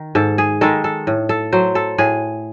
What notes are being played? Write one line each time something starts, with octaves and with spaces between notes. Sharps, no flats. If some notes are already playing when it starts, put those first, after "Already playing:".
Already playing: D#3
G#2 A4
G#4
D#3 G#3 A4
A4
A2
A4
F#3 C5
A4
A2 G#4